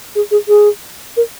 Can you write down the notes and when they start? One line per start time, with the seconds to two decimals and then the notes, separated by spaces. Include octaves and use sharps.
0.15 G#4
0.31 G#4
0.48 G#4
1.17 A#4